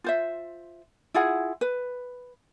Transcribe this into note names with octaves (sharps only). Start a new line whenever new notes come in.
F4 C5 E5
E4 F4 G#4 F#5
B4